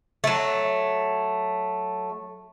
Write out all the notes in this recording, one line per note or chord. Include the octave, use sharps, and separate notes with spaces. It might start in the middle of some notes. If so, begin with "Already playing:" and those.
F#3 A3